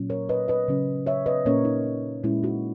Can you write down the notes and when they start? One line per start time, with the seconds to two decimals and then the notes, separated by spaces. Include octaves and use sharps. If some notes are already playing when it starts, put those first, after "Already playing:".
Already playing: A#2 F#3 C#4
0.10 A#4 C#5
0.29 B4 D#5
0.48 B4 D#5
0.68 C#3 F#3 C#4
1.06 C#5 E5
1.26 B4 D#5
1.46 A#2 A#3 C#4 A#4 C#5
1.65 D#4
2.24 A#2 G#3 C#4 E4
2.43 D#4 F#4